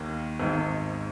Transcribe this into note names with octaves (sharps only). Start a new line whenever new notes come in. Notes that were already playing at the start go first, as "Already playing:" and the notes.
Already playing: D#2 D#3 A#3
G#1 G#2 D#3